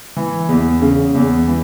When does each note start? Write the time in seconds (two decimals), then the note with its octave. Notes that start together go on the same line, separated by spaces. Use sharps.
0.16 E3
0.49 E2
0.81 C#3
1.15 E2
1.47 E3